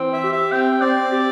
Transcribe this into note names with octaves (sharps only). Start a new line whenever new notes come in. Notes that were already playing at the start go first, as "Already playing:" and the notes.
Already playing: E3 C4
E5
G4
E5
C4 G5
C4 D5
G4